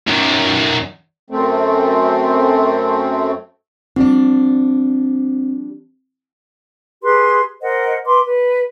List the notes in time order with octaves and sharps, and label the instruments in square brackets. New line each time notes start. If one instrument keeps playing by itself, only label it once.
[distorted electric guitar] F#2 D#3
[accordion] F#2 A3 C4
[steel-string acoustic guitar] F3 G3 D4 [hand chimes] C4
[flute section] G4 G#4 B4 C6
A#4 C5 D#5 F#5
B4 C6 D6
B4